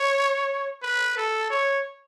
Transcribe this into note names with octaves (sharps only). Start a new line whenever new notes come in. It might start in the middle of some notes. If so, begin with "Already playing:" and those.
Already playing: C#5
B4
A4
C#5